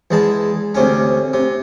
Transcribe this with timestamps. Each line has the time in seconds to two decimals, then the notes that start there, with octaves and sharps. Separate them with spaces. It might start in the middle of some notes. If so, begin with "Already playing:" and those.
0.11 E2 G#3 A5
0.75 D2 C3 C#4
1.33 C3